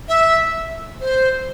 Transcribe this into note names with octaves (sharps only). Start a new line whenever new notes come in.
E5
C5